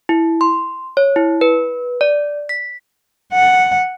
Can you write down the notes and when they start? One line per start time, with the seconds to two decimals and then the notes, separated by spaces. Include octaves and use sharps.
0.09 E4
0.41 C6
0.97 C#5
1.16 E4
1.41 B4
2.01 D5
2.49 B6
3.33 F#5